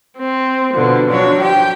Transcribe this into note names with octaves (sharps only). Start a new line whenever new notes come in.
C4
B2 D3 F3
F3 F#3 D4 C#5
G4 G5